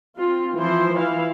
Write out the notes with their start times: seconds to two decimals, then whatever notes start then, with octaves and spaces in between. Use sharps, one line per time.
0.18 C4 F4
0.56 E3 F3 E4 C5
0.95 E3 E4 F5